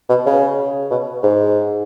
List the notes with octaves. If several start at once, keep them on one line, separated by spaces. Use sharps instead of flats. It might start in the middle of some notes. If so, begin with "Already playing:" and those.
B2
C#3
B2
G#2